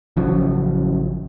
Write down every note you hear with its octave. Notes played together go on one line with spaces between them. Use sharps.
A1 C#3 F3 F#3